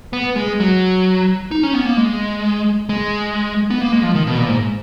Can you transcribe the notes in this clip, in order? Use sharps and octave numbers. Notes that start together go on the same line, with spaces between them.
B3
G#3
F#3
D#4
C#4
B3
A#3
G#3
G#3
B3
A#3
G#3
F3
D#3
B2
A#2
G#2